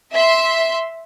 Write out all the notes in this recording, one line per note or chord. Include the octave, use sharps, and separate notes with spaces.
E5 C6